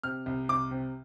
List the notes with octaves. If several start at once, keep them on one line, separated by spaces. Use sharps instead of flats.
C3 F6
C2
C2 D6
C3